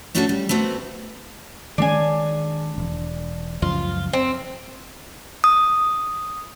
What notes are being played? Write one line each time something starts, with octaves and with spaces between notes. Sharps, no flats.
A3 C#4 D4 F#4 G#4 A4
G3
A3 B3 C4 F#4
D#3 G#3 C#4 D4 G#5
E1
C#2 F#2 F3 F4
C4
D#6